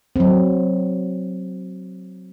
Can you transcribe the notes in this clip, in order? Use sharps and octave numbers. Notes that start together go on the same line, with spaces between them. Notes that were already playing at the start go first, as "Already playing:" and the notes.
F#3 C4